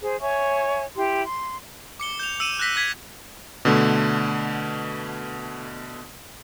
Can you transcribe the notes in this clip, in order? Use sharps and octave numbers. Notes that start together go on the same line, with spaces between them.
G#4 C5
C#5 E5 G#5 C#6
E4 G4 C6
C6
D6 C#7 G7
G6 F7
E6 C#7 D#7 E7
F#6 G6 A#6 B6
E6 G#6 B6
B2 D3 A3